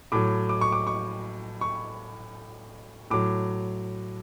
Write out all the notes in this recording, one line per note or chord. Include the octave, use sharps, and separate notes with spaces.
A2 F#3 D6
D6
C#6
D6
C#6
C#6
A2 F#3 D6